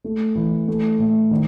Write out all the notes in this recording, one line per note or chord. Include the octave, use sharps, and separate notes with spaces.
A3
E3
A3
A2
D#3